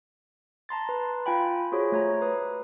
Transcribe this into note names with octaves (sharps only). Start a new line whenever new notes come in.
A5 A#5 C6 A6
B4
F4 F5 G5 G#5 B5
F4 F#4 G#4 C5 C#5
A3 C#5 A#5
B4 D#6